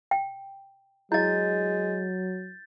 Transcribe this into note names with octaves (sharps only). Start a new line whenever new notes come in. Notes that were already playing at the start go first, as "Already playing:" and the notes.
G5
F#3 G#3 E4 D#5 G6 A6